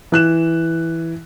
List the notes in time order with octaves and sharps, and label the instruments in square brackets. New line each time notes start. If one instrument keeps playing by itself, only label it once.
[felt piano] E3 F#6 E7